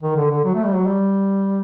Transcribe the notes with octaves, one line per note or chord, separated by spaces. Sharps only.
D#3
D3
D3
F#3
A3
G3
F#3
G3